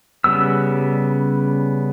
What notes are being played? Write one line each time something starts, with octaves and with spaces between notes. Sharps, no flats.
C#3 G3 B3 E6